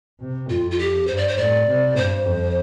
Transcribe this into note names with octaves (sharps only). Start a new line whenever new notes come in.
C3
F2 F4
F4
G4
G2 C5
D5
C5
A2 D5
C3
G2 C5
F2